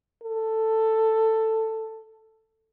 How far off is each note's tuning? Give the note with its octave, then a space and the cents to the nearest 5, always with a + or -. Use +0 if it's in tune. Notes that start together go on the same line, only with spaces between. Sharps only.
A4 +10